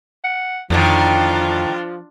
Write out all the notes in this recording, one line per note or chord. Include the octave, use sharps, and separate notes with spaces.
F#5
F2 A2 D3 D#3 F3 D4 F4